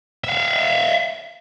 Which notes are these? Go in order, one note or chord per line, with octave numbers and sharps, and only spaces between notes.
E5 F5